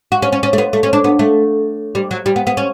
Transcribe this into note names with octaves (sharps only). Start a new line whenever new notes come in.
F#4
C#4
C#4
C#4
A3
B3
A3
C#4
D4
B3
A3
G3
F#3
G3
B3
B3
C#4